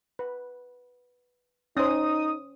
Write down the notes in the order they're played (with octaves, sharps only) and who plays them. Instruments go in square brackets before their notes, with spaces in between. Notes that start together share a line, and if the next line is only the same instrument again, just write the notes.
[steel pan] B4
[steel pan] C#4 C5 [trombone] D#4 [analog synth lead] D#6